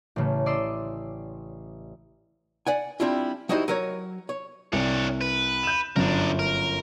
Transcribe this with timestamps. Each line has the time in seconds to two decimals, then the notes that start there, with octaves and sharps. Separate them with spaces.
0.16 A1 C#3 A3
0.46 D5 D#5 C6 E6
2.67 D5 F#5 G#5
3.00 G3 C4 D4 E4 F4
3.49 G3 D#4 E4 F#4 C5 D#5
3.68 F#3 A#4 C#5
4.29 C#5
4.73 C2 D4 C#5
5.21 B4
5.63 G6 E7
5.96 G1 F#2 D4 A#4
6.39 A#4